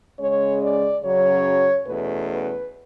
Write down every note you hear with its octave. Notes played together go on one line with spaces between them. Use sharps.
C#3 G#3 C#4 C#5
D5
F#2 C#3 F#3 C#4 C#5
E2 B2 A3 C#4 B4
B4